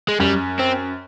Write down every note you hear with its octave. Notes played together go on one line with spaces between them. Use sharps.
G#3
F#2 G3
C4